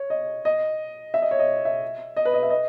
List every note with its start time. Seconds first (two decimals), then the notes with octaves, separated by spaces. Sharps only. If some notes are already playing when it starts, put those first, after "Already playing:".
Already playing: C#5
0.10 D#5
0.45 D#5
1.14 E5
1.22 D#5
1.31 C#5
1.39 D#5
1.65 E5
2.16 D#5
2.25 B4
2.34 D#5
2.43 E5
2.50 D#5